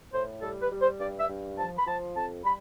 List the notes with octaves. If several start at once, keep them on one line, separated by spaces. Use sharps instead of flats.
A2 C5
G3 A4
B4
G3
C5
G2 D5
E5
G2
F3 A5
B5
F3 A5
F2 A5
G3 B5